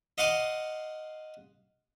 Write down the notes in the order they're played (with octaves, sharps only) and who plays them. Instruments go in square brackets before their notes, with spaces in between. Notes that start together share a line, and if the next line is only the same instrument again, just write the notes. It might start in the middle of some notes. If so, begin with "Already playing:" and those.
[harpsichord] D#5 F5 F#5 C6 D6 D#6